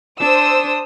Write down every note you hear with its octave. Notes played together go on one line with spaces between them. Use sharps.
D4 C5 D#6 E6